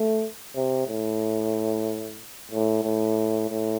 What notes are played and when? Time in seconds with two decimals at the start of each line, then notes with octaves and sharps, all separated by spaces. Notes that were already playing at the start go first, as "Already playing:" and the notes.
Already playing: A3
0.55 C3
0.88 A2
2.51 A2
2.83 A2
3.49 A2